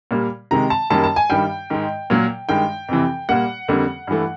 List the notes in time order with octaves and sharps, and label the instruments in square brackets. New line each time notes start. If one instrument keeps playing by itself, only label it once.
[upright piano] A#2 G3 A#3
C3 D#3 G#3 A#5
A5
F#2 D#3 G3 A#3 A5
A5
G#5
G2 D#3 G3 G5
G#2 D#3 G#3
A#2 F#3 A#3
G2 D#3 G#3 G5
F2 C3 E3
A#2 G3 A#3 F#5
F2 D3 G3 A#3
G2 E3 A3